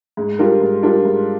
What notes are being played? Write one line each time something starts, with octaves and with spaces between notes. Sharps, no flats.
G#2
G3 D4 F4 A#4
G#2
G3 D4 F4 A#4
G#2